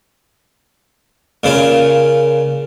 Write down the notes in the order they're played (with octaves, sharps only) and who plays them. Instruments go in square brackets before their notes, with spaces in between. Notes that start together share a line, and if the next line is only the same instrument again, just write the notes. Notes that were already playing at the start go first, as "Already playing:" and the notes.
[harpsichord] A#2 C#3 F4